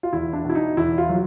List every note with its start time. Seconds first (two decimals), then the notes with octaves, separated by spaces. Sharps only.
0.03 F4
0.13 E2 E4
0.33 D4
0.44 B2
0.49 E4
0.55 D#4
0.77 E2 E4
0.98 F4
1.09 F#3